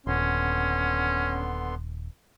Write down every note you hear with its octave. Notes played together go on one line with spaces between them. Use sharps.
D#1 D3 B3 C#4 C6